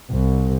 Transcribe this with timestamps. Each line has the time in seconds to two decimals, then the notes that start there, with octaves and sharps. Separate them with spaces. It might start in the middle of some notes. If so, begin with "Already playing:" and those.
0.12 C2